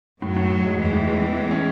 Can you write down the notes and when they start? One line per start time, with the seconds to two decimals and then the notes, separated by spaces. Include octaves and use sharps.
0.21 F#2 A2 F#3
0.37 A2
0.50 A2
0.65 G#3
0.79 E2 E3 G#3
0.93 A2
1.08 G#3
1.22 A2
1.36 G#3
1.51 C#4